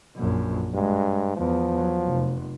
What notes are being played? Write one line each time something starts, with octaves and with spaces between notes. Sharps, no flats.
A#1 F#2
G2 G#3
E2 F3
F#3
F1